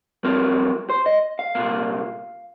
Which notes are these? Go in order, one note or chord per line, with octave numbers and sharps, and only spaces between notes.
G2 F3 C4 A#4
C5
D#5
F5
C2 A#2 A#3